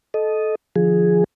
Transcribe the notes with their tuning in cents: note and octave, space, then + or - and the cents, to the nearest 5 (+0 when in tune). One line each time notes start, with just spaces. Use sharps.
A4 -20 D#5 +0
D3 +45 F3 +0 G#4 +0